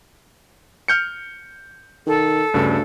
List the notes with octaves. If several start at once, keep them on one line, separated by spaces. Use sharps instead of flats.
F6 G6 C#7
D#3 A4
D2 G2 C#3